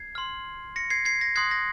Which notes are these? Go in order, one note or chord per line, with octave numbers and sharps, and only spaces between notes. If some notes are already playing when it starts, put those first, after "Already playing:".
Already playing: G#6 C7
C6 F6
A#6 C#7
G#6 C7
G#6 C7
A#6
C6 D#6 F#6 G#6 C7
A#6